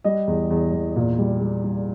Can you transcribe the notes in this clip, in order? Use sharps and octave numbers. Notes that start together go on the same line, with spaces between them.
G3 D#5
E2
E2
E2
A#2
G3
G3
G3